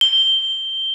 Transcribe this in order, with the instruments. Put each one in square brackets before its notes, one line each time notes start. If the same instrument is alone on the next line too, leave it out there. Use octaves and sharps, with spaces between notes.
[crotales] G7